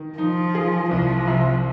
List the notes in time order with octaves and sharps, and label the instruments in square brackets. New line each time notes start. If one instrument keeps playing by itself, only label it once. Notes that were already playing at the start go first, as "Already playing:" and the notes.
Already playing: [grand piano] D#3
[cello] F3 [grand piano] D#4
[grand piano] G#4
[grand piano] C2 [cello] F3
[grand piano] C3